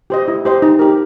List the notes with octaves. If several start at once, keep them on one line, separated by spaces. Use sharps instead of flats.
G4 C5 D#5
E4
G4 C5 D#5
D#4
G4 A#4